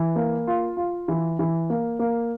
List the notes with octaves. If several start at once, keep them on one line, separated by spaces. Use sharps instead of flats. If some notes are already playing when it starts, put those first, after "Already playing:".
Already playing: E3
A#3
F4
F4
E3
E3
A#3
A#3